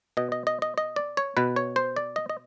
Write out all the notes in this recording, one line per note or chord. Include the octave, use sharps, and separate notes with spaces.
B2 D#5
D#5
D#5
D#5
D#5
D5
C#5
B2 B4
C#5
C5
D5
D#5
D#5